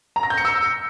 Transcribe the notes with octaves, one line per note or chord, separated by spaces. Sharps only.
A#5
A#6
G6
C#7
E6